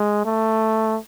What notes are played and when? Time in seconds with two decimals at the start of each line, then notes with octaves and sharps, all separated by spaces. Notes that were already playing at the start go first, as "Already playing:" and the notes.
Already playing: G#3
0.25 A3